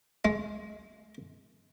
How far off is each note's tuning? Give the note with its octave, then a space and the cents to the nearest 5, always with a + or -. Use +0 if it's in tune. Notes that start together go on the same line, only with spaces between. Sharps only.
G#3 +20